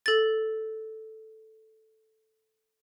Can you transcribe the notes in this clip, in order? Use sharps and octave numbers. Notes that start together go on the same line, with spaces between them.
A4 A6